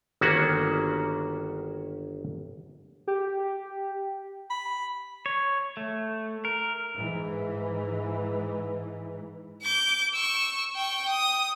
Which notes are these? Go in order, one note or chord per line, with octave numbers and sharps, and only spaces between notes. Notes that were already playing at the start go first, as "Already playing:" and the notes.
G1 D#3 A#3 C#4 D4 F#4
G4
B5
C#5
A3
A#4
G#2 E3
D6 G6
C#6 E6
G5 C#6
D#6